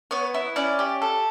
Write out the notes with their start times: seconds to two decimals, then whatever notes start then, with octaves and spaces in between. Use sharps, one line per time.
0.11 B3 C#5
0.34 E4
0.56 C#4 D5
0.79 G4
1.02 A4